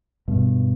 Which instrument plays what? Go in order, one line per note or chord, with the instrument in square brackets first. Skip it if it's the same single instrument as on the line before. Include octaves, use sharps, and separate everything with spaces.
[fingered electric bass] G2 B2